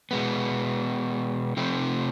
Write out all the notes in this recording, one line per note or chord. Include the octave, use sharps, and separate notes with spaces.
B2 G#3 B3
C3 F3 A3 C4